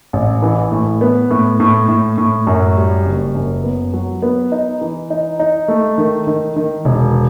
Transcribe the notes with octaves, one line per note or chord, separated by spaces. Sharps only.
A1
E3
A2
B3
A2
A2
A2
A2
F#2
G3
F#1
F#2
B3
F#3
B3
D#4
E3
D#4
D#4
A3
D#3
D#3
D#3
E1